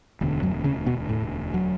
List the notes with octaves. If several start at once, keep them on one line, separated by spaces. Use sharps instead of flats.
E1 D2 D3
F#2 F#3
C#3 C#4
B2 B3
A2 A3
F#3